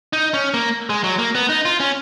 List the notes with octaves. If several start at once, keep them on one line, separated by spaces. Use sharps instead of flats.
D#4
C#4
A#3
G#3
F#3
A#3
B3
D#4
F4
C#4